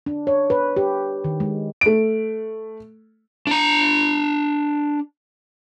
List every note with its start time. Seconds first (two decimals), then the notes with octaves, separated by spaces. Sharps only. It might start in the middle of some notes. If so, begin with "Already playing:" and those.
0.06 D4
0.27 C#5
0.50 B4
0.76 G4
1.24 D#3
1.40 G#3
1.81 A3 D7
3.47 D4 A#5